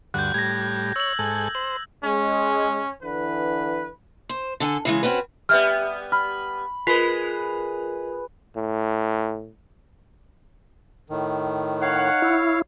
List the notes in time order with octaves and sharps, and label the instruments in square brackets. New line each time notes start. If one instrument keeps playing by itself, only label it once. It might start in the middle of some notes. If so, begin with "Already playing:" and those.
[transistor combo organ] D2 G2 F#5 [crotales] F#6 G6
[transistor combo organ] A2 G3 [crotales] G#6 A#6
[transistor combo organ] C#5 [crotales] E6 F#7
[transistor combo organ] G#2 A4 G#5
[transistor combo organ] C5 [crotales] F#7
[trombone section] G#3 [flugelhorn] C#4
[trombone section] D3 E3 [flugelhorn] B4
[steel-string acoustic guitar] C5
D3 A4 G5 G#5
C#3 E3 G#3
C4 C#4 F#4 B4
[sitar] G3 B3 [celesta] E5 F6
[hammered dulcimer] B5 [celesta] F6
[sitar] G#3 [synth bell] F4 A#4 [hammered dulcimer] B4 [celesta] B6
[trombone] A2
[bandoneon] A2 D#3
[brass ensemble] D#4 F#5 [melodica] C#5 F5
[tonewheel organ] E4